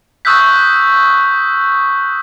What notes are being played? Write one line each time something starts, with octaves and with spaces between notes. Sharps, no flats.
C#6 D#6 E6 F#6 G6 B6